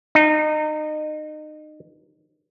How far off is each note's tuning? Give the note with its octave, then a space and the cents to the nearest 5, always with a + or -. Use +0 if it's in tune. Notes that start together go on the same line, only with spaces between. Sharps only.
D#4 -25